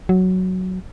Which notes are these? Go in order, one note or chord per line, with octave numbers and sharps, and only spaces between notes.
F#3